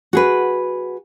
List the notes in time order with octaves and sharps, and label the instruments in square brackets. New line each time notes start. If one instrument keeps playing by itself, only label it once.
[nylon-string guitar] F#4 G#4 B4